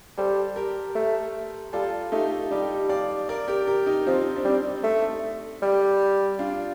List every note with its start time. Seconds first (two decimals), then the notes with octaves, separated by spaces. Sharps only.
0.17 G3 A4 C5
0.56 G4 A#4
0.95 A3
1.73 G3 F4 A4
2.12 A3 D#4 G4
2.51 G3 D#4 G4
2.89 D5 F5
3.29 A#4 D5
3.48 G4 A#4
3.67 G4 A#4
3.86 D#4 G4
4.06 F3 C4 D#4
4.36 D4
4.45 G3 C4 D#4
4.84 A3
5.62 G3
6.39 D4 F4